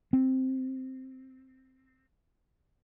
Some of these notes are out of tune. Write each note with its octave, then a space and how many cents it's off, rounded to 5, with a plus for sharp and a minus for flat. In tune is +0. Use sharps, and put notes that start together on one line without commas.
C4 +0